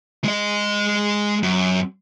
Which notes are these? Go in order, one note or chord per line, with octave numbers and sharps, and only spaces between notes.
G#3 D#5
F#2